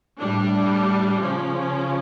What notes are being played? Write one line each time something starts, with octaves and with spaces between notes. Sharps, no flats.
A2 G3 D4
C#3 F3 C#4